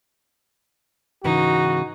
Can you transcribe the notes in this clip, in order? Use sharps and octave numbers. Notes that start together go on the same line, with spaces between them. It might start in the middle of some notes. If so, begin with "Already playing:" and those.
G#2 C#3 E3 D#4 F#4